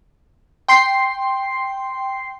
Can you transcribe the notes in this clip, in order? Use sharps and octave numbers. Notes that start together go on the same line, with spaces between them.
G5 C6 C7